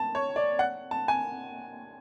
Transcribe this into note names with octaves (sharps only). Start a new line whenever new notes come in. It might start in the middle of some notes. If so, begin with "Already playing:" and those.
Already playing: A5
C#5
D5
F#5
A5
G#5